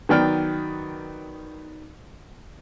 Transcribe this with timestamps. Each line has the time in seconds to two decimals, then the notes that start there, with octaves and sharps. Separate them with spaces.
0.09 D#3 F#3 B3 D5 G5 F6